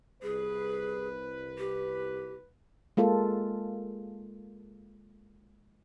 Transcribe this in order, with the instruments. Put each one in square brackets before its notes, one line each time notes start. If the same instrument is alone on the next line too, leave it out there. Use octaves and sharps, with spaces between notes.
[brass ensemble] C2 B4 [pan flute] G#4
[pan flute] G4
[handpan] G#3 A#3 F4 A4